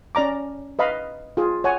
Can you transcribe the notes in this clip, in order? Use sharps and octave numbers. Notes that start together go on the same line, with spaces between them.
C#4 D5 A#5 D6
B4 D#5 F5 B5
F4 G#4
C#5 F#5 G#5